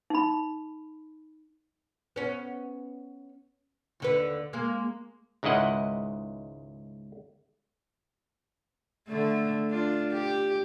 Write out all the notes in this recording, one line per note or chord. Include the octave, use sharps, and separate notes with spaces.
D#4 B5
B3 C#4
D#2 D3 B4
G#3 A#3
C#2 G#2 D#3 E4 D#5 F#5
D3 A3
D4 F4
G4